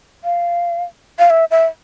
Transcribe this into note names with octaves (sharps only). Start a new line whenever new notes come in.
F5
F5
E5
E5